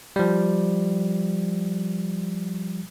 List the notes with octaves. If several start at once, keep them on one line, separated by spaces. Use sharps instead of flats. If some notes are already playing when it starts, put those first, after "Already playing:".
F3 G3